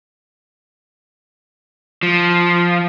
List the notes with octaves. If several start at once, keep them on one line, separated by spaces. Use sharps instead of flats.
F3